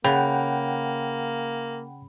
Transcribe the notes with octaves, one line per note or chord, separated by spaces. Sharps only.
C#3 A#3 F#5 G5 B5